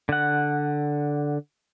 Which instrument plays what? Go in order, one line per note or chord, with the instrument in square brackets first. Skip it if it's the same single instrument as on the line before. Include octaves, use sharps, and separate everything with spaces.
[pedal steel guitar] D3 F#5